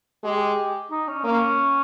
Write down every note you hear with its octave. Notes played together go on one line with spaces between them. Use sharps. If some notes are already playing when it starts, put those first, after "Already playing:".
G#3 G4
D#4
C#4
A#3 C#4